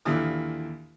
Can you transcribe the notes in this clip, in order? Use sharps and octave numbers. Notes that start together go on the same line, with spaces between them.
D#2 A#2 D3 E3 E4 D#6